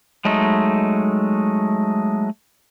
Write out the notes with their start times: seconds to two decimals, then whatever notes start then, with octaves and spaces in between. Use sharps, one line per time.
0.25 F#3 G#3 A3 D#4